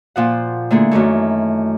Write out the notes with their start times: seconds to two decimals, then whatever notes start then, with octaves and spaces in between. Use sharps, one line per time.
0.16 A#2 F3 F#5
0.71 D3 A3 A#3 E4 G#4
0.91 F#2 D#3 E3 A3